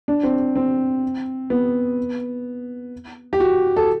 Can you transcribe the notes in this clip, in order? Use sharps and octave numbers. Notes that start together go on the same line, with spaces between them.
D4
C4
C4
B3
G4
F#4
A4